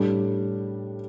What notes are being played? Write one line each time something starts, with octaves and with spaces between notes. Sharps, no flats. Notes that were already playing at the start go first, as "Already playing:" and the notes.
Already playing: A2 G3 D4